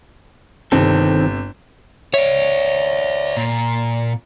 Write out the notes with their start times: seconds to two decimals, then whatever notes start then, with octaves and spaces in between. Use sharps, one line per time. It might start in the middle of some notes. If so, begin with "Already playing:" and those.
0.72 G1 C3 D#3 C4 A4
2.14 C#5 D5 E5
3.37 A#2